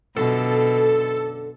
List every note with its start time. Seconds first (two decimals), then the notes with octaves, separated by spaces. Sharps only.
0.16 F#2 B2 D3 F4 A4